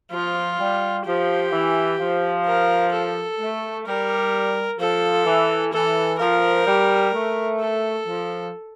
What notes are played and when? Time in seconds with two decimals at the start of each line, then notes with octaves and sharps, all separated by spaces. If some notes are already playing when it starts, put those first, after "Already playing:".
0.12 F3 F4
0.59 G3
1.05 F3 G4
1.52 E3
2.00 F3
2.45 A#4
2.93 A4
3.40 A3
3.86 G3 A#4
4.79 F3 A4
5.26 E3
5.72 E3 A4
6.19 F3 A#4
6.66 G3
7.14 A3
7.60 A4
8.07 F3